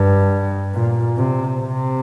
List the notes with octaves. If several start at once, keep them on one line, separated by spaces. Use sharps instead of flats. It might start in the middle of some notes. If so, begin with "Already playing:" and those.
Already playing: G2
A#2
C3
C3